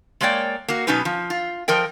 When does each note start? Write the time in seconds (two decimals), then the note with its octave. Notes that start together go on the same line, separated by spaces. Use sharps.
0.21 G#3 A#3 C#5 D5 G5
0.68 A#3 F#4
0.87 B2 F#3 B3 C#4 D#4 B4
1.05 F3
1.30 F4
1.68 F3 A#4 D#5 G5